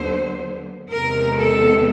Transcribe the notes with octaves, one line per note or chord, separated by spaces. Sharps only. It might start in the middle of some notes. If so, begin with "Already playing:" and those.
Already playing: D#2 D3 F#3 B3 C5
E2 C3 D#3 G#3 B3 A#4
A4